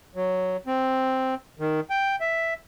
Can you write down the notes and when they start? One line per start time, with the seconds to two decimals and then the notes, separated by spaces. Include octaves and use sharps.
0.15 F#3
0.67 C4
1.59 D#3
1.90 G5
2.21 E5